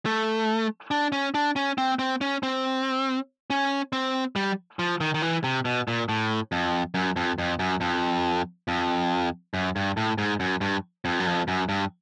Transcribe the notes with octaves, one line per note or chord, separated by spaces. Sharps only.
A3
D4
C#4
D4
C#4
C4
C4
C#4
C4
C#4
C4
G3
F3
D#3
D#3
E3
C3
B2
A#2
A2
F2
F#2
F2
F2
F#2
F2
F2
F#2
G2
A2
G#2
F#2
G2
F2
F#2
F2
F#2
G2